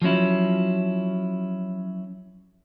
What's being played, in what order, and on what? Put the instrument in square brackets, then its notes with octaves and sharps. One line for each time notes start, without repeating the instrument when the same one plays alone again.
[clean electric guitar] F3 F#3 C#4 E4